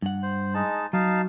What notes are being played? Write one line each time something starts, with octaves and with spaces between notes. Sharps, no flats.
G2 F#5
C5
G#3 D#4 A5
F#3 D#4 F5 A5